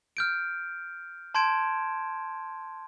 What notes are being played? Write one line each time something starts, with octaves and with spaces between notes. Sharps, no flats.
F6 G6 D7
A5 C6 G6 G#6 D7 E7